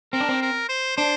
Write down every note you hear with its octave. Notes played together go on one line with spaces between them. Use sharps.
C4 A#4
D4
C4
A#4
C5
D4 C5